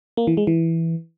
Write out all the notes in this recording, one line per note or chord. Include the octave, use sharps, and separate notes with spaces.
A#3
E3
G#3
E3